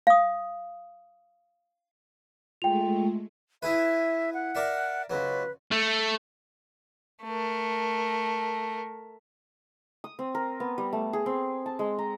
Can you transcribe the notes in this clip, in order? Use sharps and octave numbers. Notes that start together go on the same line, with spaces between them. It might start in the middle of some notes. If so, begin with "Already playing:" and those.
F5 D#6
G#3 A3 F4 G5 F7
E4 G#4 B4 E5
F#5
A#4 D5 E5
C#2 F#3 B4
A3
A3 A#4
D#6
C4
A#4
B3
G3
A3
G#4
C4
A5
G#3
A#5